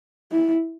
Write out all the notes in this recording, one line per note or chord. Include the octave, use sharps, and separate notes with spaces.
E4